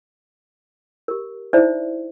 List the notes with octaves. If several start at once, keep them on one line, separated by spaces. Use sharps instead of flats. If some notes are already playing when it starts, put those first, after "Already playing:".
G4 A#4
D#4 E4 C5 D5 E5